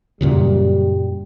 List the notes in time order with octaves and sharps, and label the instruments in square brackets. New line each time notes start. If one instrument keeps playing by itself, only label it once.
[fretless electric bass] F#2 A#2 C#3 [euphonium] G3